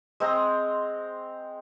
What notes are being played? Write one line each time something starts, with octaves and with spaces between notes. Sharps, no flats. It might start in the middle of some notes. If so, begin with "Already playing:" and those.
G#3 C4 A#5